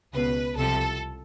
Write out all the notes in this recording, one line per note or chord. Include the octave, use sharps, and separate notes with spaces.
C#2 B2 B4
C2 C3 F3 A4